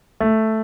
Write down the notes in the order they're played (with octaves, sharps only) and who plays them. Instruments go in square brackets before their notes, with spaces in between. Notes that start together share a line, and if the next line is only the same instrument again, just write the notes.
[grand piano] A3